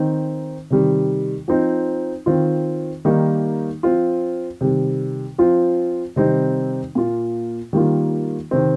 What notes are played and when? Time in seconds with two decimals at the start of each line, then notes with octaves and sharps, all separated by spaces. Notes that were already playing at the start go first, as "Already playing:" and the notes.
Already playing: D#3 C4 D#4
0.70 C3 D#3 G3
1.48 F3 C4 D#4
2.26 D#3 C4 F4
3.05 D#3 G3 A#3 D#4
3.83 F3 C4 F4
4.61 C3 D#3 G3
5.38 F3 C4 F4
6.16 C3 D#3 G3 C4 D#4
6.95 A#2 A#3 F4
7.73 D#3 G3 A#3 F4
8.51 C3 D#3 C4